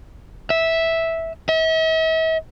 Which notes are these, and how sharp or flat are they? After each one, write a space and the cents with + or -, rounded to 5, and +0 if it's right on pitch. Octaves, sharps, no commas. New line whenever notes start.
E5 -10
E5 -45